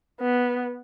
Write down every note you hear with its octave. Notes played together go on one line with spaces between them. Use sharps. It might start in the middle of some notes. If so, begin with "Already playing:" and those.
B3